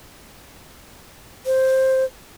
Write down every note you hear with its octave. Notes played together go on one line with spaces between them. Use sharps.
C5